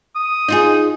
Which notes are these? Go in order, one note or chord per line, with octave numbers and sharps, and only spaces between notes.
D#6
D#4 F4 G#4